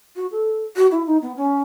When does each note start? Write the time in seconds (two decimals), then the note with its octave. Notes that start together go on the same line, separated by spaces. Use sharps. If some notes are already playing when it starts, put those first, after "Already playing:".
0.16 F#4
0.32 A4
0.76 F#4
0.92 E4
1.07 D#4
1.22 B3
1.37 C#4